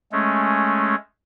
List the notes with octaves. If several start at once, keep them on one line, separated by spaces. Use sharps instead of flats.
G#3 A3 C#4